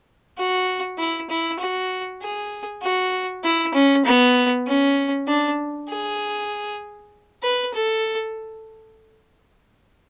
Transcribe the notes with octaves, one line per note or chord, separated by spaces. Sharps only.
F#4
E4
E4
F#4
G#4
F#4
E4
C#4
B3
C#4
D4
G#4
B4
A4